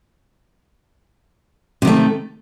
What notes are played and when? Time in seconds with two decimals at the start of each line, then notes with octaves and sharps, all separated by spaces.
1.82 C3
1.85 D#3
1.87 A3